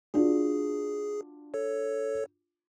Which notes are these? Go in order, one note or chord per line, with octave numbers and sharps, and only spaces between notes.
D4 F4 F#4 G#4
A4 C#5